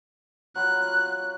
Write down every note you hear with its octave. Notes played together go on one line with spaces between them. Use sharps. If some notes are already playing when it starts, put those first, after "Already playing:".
F#3 F4 B5 F#6